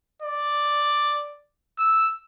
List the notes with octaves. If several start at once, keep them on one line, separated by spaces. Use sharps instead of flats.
D5
E6